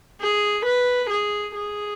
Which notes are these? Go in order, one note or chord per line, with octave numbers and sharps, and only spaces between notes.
G#4
B4
G#4
G#4